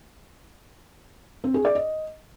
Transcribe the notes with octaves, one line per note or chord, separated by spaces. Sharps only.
C4
G#4
D5
D#5